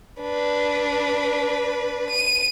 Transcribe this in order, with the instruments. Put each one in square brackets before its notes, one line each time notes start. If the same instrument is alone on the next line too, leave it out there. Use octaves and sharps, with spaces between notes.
[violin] D4 B4
D#7